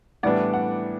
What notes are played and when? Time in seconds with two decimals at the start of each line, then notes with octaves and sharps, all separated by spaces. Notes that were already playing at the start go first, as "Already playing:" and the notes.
0.23 A2 E3 G3 B3 D4 D5 F#5
0.54 F#5